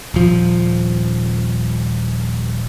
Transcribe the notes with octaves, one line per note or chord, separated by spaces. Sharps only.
D#1 F3